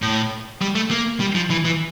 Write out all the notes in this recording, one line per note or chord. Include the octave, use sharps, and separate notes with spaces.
A2
G3
A3
A#3
G3
F3
E3
E3